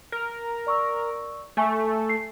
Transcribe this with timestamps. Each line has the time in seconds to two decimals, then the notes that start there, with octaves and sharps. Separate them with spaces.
0.12 A#4
0.67 D5 C#6 E6
1.57 A3 G#5 C#6
2.09 C7